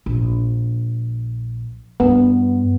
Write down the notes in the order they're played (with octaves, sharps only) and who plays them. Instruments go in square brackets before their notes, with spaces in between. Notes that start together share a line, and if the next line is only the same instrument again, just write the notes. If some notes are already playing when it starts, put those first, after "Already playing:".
[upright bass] A#1
[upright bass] G2 [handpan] B3